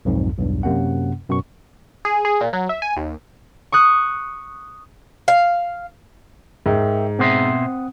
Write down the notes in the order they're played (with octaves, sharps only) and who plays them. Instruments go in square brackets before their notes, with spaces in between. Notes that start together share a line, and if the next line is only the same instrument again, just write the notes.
[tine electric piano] B1 F2 G#2
B1 E2 G2
F#2 C3 A#3 C#4 F#5
F#2 B2 C#6
[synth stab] G#4
G#4
A#2
F#3
E5
G#5
D#2
[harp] C#6 D#6 F#6
[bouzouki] F5
[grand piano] G#2 [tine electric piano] A#4 E5 G5
[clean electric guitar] B2 C5 E5 [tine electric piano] C4 F#5 D#6